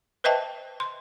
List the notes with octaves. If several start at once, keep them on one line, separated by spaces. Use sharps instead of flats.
B4 C5 D#5 E5 G5 A5
C6